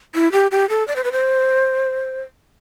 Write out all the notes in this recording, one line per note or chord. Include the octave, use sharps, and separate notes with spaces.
E4
G4
G4
A4
D5
C5
B4
C5